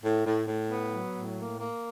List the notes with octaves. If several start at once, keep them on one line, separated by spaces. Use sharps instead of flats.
A2
A2
A2
B3
F#3
A2
A#3
A#3